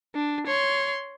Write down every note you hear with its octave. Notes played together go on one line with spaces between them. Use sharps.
D4
C#5 C6